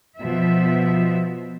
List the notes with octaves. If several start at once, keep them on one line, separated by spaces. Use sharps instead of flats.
B2 F3 E5